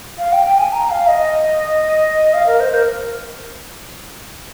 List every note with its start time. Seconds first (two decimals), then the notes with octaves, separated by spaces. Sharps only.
0.18 F5
0.32 G5
0.45 G5
0.58 G#5
0.72 A#5
0.90 F5
1.07 D#5
2.34 F5
2.46 A#4
2.60 C5
2.74 A#4